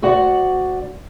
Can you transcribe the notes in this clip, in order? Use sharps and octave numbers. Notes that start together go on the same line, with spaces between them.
D2 F#4 D5 F#5